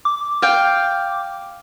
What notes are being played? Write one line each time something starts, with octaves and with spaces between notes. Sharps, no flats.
D6
F5 G5